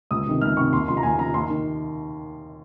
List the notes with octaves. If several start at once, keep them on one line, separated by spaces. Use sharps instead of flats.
C#2 D#6
C3 D#3
C#2 F6
C3 D#3 C#6
D#2 C6
C#3 F3 C6
A#5
D#2 G#5
C#3 F3 A#5
D#2 C6
D#3